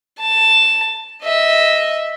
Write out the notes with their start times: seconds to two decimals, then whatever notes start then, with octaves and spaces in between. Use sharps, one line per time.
0.20 A5
1.24 D#5 E5